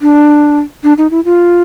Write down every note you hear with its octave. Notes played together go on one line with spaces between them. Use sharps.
D4
D4
D#4
E4
F4